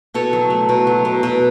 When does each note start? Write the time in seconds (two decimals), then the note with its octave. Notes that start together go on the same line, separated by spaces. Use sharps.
0.14 B2 A4 C#5
0.33 F#3
0.50 A3
0.69 B2
0.87 F#3
1.05 B2
1.23 B2